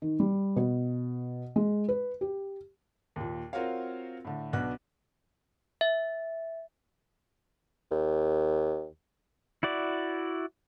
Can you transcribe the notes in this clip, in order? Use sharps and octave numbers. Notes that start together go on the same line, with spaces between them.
D#3
G3
B2
G#3
B4
G4
D#2 A#2
C4 F4 F#4 A#4 C#5 F5
A2 D3
B1 B3 D4 F#4 F#6
E5
D#2
E4 F#4 D5